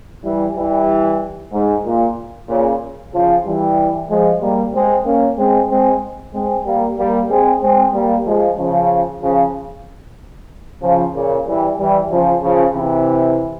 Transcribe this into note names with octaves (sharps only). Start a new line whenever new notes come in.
E3 G3
E3 G3
G#2
A#2
A#2 C#3
C#3 F3
E3 G3
F3 G#3
G3 A#3
G#3 C4
A#3 C#4
G#3 C4
G#3 C4
G#3 C4
G3 A#3
G3 A#3
G#3 C4
G#3 C4
G3 A#3
F3 G#3
C#3 F3
C#3 F3
C#3 F3
A#2 C#3
E3 G3
E3 G3
C#3 F3
C#3 F3
C3 E3